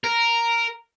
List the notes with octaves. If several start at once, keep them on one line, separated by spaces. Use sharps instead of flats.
A#4